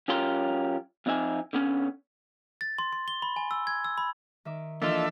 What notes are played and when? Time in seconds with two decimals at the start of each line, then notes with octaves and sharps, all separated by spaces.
0.08 F#2 C#4 F4 G4 A#4 C6
1.06 F2 C4 D#4 E5 G#5
1.53 D3 B3 C#4
2.61 A6
2.79 C6
2.93 C6
3.08 G7
3.22 B5
3.36 G#5
3.51 E6
3.67 G#6
3.85 E6
3.98 B5
4.45 D#3 E5 D6
4.82 E3 F3 A#3 D4 F4 A4 D#5 E5